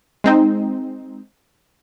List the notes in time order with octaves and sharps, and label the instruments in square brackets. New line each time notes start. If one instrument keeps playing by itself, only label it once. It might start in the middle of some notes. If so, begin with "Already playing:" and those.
[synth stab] G#3 C4 D#4